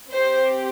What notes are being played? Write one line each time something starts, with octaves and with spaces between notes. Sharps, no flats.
C4 G4 C5